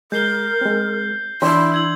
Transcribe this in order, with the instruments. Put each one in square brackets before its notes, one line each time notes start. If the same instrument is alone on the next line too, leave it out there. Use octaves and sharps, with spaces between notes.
[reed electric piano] G#3 [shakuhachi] A#4 [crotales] G6 C7 G7
[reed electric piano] G#3 C4
[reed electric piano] E3 D4 [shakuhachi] E4 [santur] C6
[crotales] E6 G#6 F#7